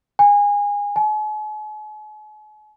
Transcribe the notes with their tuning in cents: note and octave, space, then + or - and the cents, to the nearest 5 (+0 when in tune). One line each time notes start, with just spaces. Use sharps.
G#5 -25
G#5 +45